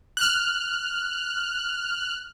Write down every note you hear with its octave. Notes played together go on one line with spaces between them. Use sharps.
F6 F#6